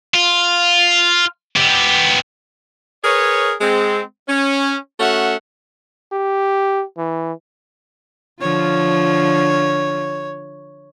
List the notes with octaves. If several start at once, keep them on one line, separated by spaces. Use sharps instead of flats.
F4
B3 G4
G#4 A#4 B4 C#5
G#3 C4
C#4
A3 C#4 F#4 E5 F#5
G4
E3
D3 F3 F4 C#5